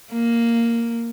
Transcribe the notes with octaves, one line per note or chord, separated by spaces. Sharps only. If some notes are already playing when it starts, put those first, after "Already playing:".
A#3